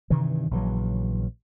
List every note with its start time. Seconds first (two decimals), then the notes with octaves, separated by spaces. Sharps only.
0.10 G2 C3 D#3 E3
0.51 A#1 C#3 E3 F#3